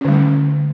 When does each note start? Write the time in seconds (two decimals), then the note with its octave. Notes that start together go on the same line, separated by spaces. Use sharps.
0.01 C#4
0.05 D3
0.08 G3
0.12 A3